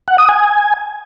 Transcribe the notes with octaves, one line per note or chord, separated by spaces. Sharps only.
F#5
D#6
G#5